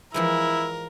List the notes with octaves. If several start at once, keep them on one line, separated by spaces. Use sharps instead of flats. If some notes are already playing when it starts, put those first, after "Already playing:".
E3 F3 G#3 E4 A#4